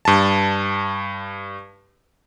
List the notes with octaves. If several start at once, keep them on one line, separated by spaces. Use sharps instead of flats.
G2 A5